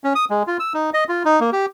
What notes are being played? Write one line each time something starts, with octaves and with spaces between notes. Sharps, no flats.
C#4
D#6
G#3
F4
E6
D#4
D#5
F4
D#4
A#3
G4